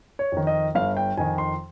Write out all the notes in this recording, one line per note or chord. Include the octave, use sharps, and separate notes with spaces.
C#5
F2 D#3
D#5
G1 F5
G5
F2 D#3 G#5
C6